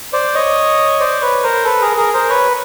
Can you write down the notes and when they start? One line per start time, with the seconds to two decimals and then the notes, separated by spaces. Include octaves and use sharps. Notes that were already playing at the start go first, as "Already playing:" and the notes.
0.13 C5 D5
0.34 C#5 D#5
1.00 C5 D5
1.21 B4 C#5
1.43 A#4 C5
1.64 A4 B4
1.81 G#4 A#4
1.97 G#4 A#4
2.14 A#4 C5
2.30 B4 C#5